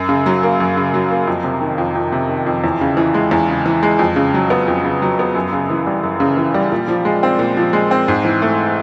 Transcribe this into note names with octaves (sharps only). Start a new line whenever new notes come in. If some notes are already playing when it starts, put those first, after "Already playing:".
Already playing: F#2
C#3
F#3
A#3
F#2
C#3
F#3
A#3
F2
C3
D#3
F2
F2
C3
D#3
F2
E2
C#3
E3
G#3
E2
C#3
E3
G#3
F2
C#3
F#3
B3
F2
C#3
F#3
B3
F#2
C#3
E3
G3
F#2
C#3
E3
G3
A#2
F3
G#3
C4
A#2
F3
G#3
C4
G#2
E3
A3